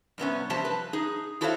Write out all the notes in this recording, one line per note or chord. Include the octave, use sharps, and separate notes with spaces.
G2 C3 B3 C#4
G2 C3 F3 G4 C5 A5
B4
D#4 G#4
E4 F#4 A4 C5 C#5 F5